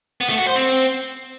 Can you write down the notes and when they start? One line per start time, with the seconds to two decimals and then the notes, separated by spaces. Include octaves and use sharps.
0.21 B3
0.29 A3
0.38 F#4
0.47 C5
0.56 C4